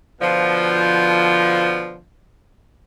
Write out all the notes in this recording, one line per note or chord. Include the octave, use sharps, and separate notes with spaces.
B2 D3 F3